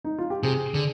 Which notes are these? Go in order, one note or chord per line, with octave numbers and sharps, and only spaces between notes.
D#4
F4
G4
C3 G#4
D3 G#4